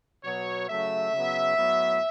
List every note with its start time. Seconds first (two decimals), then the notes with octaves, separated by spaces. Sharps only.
0.24 B2 F#3 B3 C#5
0.68 C#3 F#3 A3 E5
1.12 C#3 F#3 B3
1.56 A2 F#3 B3